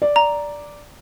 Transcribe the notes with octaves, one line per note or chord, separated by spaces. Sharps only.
D5
A#5